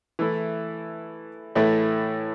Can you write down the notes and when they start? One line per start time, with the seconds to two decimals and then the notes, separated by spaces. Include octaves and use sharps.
0.19 E3 A3 E4
1.55 A2 E3 A3 E4